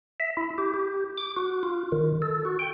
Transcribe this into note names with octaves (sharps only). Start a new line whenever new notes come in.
E5
E4
G4
G4
D6
F#4
F4
D#3
A4
F#4
G5